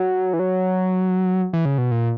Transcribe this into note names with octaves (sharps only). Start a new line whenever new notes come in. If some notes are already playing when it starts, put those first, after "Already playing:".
Already playing: F#3
E3
F#3
E3
C#3
B2
A#2